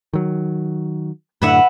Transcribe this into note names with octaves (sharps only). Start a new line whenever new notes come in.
D#3 F#3
F#2 A2 D3 B4 E5 F#5